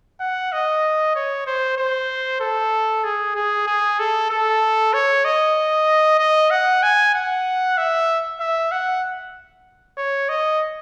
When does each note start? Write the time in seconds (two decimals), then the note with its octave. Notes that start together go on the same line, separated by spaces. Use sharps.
0.20 F#5
0.52 D#5
1.15 C#5
1.47 C5
1.77 C5
2.40 A4
3.04 G#4
3.36 G#4
3.67 G#4
3.99 A4
4.30 A4
4.93 C#5
5.25 D#5
6.19 D#5
6.50 F#5
6.83 G#5
7.14 F#5
7.78 E5
8.40 E5
8.71 F#5
9.98 C#5
10.29 D#5